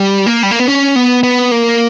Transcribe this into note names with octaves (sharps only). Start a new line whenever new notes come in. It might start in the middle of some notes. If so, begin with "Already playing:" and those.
Already playing: G3
A#3
G3
A#3
B3
C#4
B3
B3
A#3